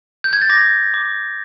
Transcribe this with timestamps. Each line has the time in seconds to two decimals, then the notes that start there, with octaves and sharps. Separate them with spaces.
0.24 G6
0.33 G#6
0.42 A6
0.49 D6 A#6
0.94 D6